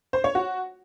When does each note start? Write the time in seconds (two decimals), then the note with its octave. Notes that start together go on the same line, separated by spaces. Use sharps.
0.13 C5
0.24 C#5
0.35 F#4